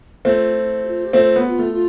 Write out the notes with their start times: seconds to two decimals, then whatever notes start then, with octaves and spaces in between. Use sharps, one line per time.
0.25 A3 C4 F4
0.55 F4
0.58 E4
0.84 G4
0.88 F4
1.05 G4
1.13 A3 C4 F4
1.36 B3
1.44 G4
1.48 F4
1.59 A3
1.73 F4